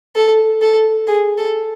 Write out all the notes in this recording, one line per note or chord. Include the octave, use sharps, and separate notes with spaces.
A4
A4
G#4
A4